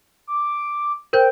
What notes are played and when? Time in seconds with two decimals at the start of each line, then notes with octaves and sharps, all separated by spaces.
0.27 D6
1.13 A#4 C5 G5 G6